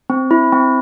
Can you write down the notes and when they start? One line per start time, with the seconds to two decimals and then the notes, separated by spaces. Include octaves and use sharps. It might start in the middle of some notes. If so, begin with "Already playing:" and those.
0.10 C4
0.31 E4
0.53 C4